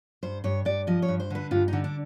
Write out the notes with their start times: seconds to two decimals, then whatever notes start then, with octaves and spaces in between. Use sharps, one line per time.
0.23 G2 C5
0.44 G2 C#5
0.65 G2 D5
0.87 F3 D#5
1.02 C#5
1.08 G2
1.20 C5
1.30 D3 B4
1.51 G2 F4
1.68 D3 D#4
1.84 D4